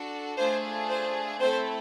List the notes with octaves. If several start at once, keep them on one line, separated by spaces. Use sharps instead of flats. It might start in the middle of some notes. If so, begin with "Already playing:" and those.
Already playing: D4 F#4 A4
A3 D4 F4 G#4 C5
C5
A3 C4 E4 A4 C5